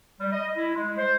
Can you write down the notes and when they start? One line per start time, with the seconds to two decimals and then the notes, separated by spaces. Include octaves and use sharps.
0.20 G3
0.33 D#5
0.56 E4
0.75 G#3
0.98 C5